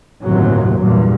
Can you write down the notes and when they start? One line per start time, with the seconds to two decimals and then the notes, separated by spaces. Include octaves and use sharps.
0.22 G1 D#2 A2 C3 F#3
0.80 E2 G2 A#2